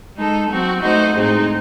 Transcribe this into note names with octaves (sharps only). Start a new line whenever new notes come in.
G#3 D#4 A4
F#3 C4 F#4
A3 D#4 F#4 C5 D#5
A2 G#3 C4 D#4